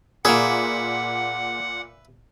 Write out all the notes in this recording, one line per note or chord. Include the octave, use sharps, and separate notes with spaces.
A#2 A#3 G#4 B4 E5 F#5